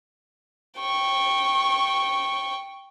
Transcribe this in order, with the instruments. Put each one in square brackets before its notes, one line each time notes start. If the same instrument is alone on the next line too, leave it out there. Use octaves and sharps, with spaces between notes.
[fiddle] G5 C#6